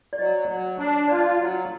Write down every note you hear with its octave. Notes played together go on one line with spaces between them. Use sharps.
D5
F#3 D#5
F#3
D4
F4 D5
F#3